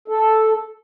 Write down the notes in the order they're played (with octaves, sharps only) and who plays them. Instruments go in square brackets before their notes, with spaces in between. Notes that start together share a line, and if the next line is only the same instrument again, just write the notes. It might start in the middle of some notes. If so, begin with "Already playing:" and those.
[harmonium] A4